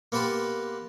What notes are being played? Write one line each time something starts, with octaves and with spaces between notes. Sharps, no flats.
A#3 B3 G4 B4 A5 C6